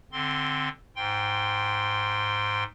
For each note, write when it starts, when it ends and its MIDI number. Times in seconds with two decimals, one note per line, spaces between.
0.12 0.69 50
0.12 0.69 60
0.12 0.69 84
0.96 2.64 44
0.96 2.64 79
0.96 2.64 84